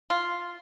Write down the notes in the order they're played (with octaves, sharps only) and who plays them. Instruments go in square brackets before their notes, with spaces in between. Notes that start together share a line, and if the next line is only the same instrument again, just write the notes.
[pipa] F4